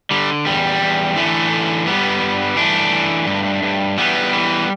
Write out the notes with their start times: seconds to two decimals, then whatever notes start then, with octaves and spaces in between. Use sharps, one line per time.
0.11 D3 G3
0.46 E2 G3
0.82 E2
1.16 D3 E3 A3
1.51 D3
1.87 G2 G3 B3
2.22 G2
2.57 E3 A3 D4
2.92 E3
3.27 G2
3.63 G2
3.98 E3 G3 B3
4.33 E3